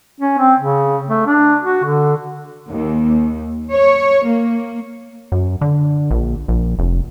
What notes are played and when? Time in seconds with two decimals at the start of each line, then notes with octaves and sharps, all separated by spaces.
0.20 C#4
0.39 C4
0.59 C#3
1.09 A3
1.27 D4
1.63 F#4
1.84 D3
2.71 D#2
3.72 C#5
4.27 A#3
5.32 F#2
5.61 D3
6.11 A#1
6.48 A#1
6.79 F1